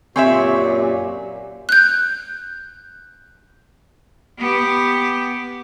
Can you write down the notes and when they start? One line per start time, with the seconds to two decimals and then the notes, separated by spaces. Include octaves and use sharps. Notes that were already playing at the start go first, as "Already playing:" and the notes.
0.16 F#2 A#2 C4 G4 C#5 E5 G#5 C#6
1.69 F#6 G6
4.39 B3 G4